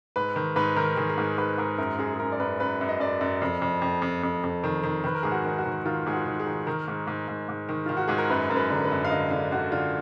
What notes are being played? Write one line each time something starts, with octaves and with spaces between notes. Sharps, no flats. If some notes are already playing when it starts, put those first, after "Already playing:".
G#2 B4
D#3
G#2 B4
D#3 A#4
D#3 G#4
G#4
G#2 A#4
G#2 B4
G#2 A#4
F#2 A#4
F#2 G#4
G#4
F#2 A#4
D5
F#2 B4
F#2 B4
F#2
D#5
F#2 D5
F#2
F2
F2
F2
F2
F2
F2
D#3
D#3
D#3 B4
A#4
G#2 G#4
F#4
D#3
F#4
D#3
D#3 F4
G#2 G#4
F#4
D#3
G#4
D#3
D#3 A#4
G#2
G#2
G#2
G#2
D#3
D#3 F4
F#4
G#2 G#4
A#4
F#2 B4
F#2 A#4
B4
D3
B4
F#2
F5
D3 D#5
D3 F5
D3 F#4
D3 F4